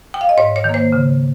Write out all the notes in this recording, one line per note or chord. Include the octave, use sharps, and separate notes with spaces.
G5
F5
D#5
G#2 C#5
C#5
D#3
A#3 C5
C#3